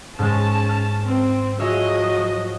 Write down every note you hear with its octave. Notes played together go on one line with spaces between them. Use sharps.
G#2 G#3 C#4 A5
F6
C4
F3 F#3 G#4 C#5 D#5 E5